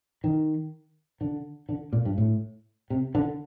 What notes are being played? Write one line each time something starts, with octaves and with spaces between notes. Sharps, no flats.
D#3
D3
D3
A#2
G2
A2
C3
D3